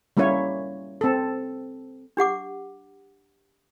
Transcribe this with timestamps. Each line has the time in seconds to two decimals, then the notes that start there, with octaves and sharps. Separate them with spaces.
0.17 G3 A#3 C#4 E4 C#5
1.01 C4 A4
2.17 D4 G4 F#5 D6